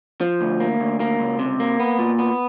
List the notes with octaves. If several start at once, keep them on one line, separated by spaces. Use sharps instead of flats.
F3
D2
A#3
D2
A#3
C#2
C3
A#3
B3
A#2
B3